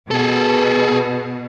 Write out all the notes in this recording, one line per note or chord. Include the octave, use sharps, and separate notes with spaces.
B2 G#4 A4